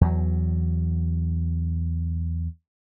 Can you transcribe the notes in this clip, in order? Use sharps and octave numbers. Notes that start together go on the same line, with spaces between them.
E2 F#3